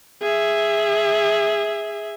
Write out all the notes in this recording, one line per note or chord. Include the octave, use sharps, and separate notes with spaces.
G#4 E5